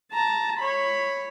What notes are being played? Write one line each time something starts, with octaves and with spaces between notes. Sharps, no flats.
A5 A#5
C#5 B5